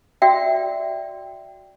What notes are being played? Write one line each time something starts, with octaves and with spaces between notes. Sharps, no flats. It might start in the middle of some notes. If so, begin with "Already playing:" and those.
F#4 D5 E5 G5